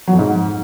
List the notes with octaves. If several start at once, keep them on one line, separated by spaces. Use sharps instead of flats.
F#3
F2
G#2